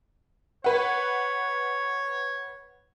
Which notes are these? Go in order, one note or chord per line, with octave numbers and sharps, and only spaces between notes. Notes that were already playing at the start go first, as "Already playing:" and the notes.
B4 C#5 F#5